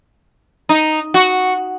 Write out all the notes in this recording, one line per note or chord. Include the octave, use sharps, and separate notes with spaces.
D#4
F#4